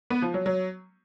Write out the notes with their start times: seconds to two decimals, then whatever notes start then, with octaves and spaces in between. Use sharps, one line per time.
0.10 B3
0.22 F3
0.34 F#3
0.46 F#3